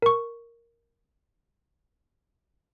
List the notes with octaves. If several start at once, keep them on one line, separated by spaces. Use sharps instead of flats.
A#4 C#6